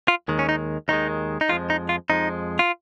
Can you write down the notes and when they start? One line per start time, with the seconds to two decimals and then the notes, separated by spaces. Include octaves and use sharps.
0.08 F4
0.28 D#2 D#3 G#3
0.39 C#4
0.49 D#4
0.88 D#2 D#3 G#3 D#4
1.41 D#4
1.49 F2 F3 G#3 F4
1.70 D#4
1.89 F4
2.10 F2 F3 G#3 D#4
2.59 F4